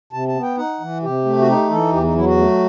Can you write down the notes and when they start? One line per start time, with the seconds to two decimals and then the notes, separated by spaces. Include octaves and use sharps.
0.13 C3 A5
0.28 A5
0.35 B3
0.43 G5
0.57 D#4 F#5
0.80 E3
1.03 C3 G4
1.25 A3
1.40 F#4
1.47 D#4 G4
1.70 E3 A4
1.92 E2 G4
2.04 D#4
2.15 F#3 E4
2.26 F#4
2.37 A3